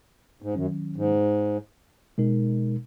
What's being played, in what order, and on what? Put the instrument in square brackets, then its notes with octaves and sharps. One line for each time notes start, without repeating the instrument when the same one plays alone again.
[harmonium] G#2
[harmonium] F#2 [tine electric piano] D#3 F#3 C#4
[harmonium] G#2
[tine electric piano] B2 G#3 D#4 A#4